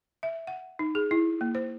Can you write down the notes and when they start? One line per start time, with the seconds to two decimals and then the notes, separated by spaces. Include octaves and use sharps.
0.23 E5
0.47 F#5
0.79 D#4
0.95 G#4
1.11 E4
1.41 A#3
1.55 C5